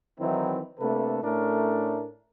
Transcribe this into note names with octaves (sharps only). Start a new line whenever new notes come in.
D#3 E3 F#3 C4 D#4 E4
C3 A3 A#3 D4 A4 B4
A2 A3 C#4 D4 A#4